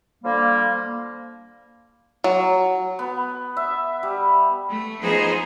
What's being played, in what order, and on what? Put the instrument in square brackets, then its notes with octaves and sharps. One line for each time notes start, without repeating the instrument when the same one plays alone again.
[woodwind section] D3 F3 G3 A#3
[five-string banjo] F#3
[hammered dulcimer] B3
E5
G3
[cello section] A3
F3 B3 D#4 G#4 C5